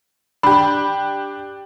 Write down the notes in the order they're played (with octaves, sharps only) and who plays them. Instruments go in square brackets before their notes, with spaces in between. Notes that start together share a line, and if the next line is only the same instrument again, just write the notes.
[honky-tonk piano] D4 G4 [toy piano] B5